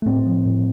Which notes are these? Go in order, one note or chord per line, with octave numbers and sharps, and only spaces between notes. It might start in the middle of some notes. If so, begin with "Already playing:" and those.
A3
A2 C4
F3
A2